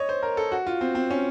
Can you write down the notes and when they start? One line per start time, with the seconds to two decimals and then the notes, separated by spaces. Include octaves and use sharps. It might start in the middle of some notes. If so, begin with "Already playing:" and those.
Already playing: C#5 D#5
0.09 C5
0.23 A#4
0.37 A4
0.52 F#4
0.67 F4
0.81 C4
0.95 C4
1.11 C#4